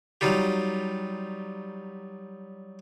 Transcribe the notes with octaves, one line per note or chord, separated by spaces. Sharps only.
F#3 G3 D#4 F4 G4